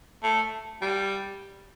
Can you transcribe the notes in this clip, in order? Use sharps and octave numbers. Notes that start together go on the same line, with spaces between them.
A3
G3